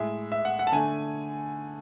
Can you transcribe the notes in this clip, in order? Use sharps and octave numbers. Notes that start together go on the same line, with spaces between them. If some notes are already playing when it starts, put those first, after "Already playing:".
Already playing: A2 G#3 E5
E5
F#5
F#5
A5
D3 A3 G#5